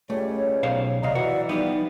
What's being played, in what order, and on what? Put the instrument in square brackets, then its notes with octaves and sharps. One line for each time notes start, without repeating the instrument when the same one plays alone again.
[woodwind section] C#2 G3 [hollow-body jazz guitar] A3 [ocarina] C#5
[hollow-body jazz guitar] B1 C5 F5
[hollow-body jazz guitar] D2 C3 F5 [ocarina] D5 [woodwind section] D#5 A#5
[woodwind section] E3 [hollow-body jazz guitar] F#4
[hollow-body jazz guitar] F3 G3 B3 [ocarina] D#4